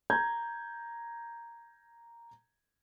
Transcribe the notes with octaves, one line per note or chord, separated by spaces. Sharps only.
A#5 G6 G#6